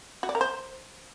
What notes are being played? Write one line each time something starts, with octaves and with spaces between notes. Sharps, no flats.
F#4
D5
A#4
C5